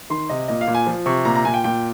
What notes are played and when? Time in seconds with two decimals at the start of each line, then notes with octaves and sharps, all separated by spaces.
0.10 D#3 C6
0.29 C3 D#5
0.48 A#2 D#5
0.61 F5
0.67 A#2
0.74 G#5
0.87 F3
1.06 C3 C#6
1.25 A#2 A#5
1.36 A#5
1.45 A#2 G#5
1.54 G5
1.64 A#2 G5